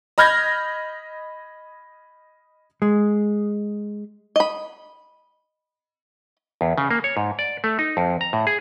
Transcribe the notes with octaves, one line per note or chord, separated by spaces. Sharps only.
D#5 B5 F6 G6 G#6 A#6
G#3
D#5 B5
E2
C#3
A#3
C#5
G#2
D5
A3
D#4
F2
A#5
A2
G#4